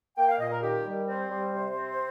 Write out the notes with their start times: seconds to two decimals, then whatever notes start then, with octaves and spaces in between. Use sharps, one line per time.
0.18 A#3 G5
0.29 F5
0.39 A#2 D#5
0.51 A#4
0.62 D#3 G4
0.85 G3
1.08 C4 C5
1.30 G3
1.52 C3
1.75 C4